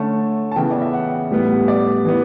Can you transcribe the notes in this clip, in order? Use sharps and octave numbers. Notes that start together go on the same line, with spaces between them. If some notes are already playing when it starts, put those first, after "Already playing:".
Already playing: D3 A3 C#4 A5
A5
C#3 E3 B3 G5
D5
E5
F#5
A2 G3 B3
D5
E3 B3